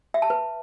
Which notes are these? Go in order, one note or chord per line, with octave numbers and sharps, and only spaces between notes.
E5
A5
B4